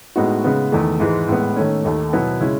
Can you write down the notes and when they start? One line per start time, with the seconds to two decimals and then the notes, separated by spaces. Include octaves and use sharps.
0.16 A2 G#3 B3 D#4 F#4
0.44 C#3 G#3 B3
0.72 E2 D#3 A3
1.00 G#2 E3 G#3
1.28 A2 G#3 B3
1.56 D#3 A3 C#4
1.85 D#2 D#3 A3
2.13 B2 F#3 B3 E4
2.40 C#3 G#3 C#4 E4